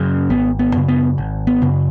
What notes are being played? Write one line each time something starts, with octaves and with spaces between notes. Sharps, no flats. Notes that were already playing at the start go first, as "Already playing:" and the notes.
Already playing: F#2 C#3
G#1 B3
B3
F#2 C#3
B3
G#1
B3
F#2 C#3